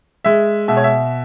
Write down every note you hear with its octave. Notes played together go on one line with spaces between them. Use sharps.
G#3 E5
B2 E5
C#5
E5